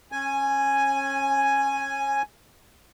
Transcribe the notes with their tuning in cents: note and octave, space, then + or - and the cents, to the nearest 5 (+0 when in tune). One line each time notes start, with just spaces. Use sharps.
C#4 -30 G#5 +0